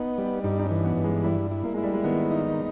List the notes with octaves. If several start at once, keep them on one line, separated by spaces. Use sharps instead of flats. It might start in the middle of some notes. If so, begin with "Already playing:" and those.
Already playing: B3 D#4
G3
G2 D#4
D#4
C#4
E3
B3
G2
G#3
G3 E4
E4
A#3
G#3 E4
G3
G#3
D#3 B3
D#4